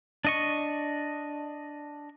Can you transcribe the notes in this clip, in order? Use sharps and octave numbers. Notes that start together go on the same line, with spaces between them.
D4 D#5 C#6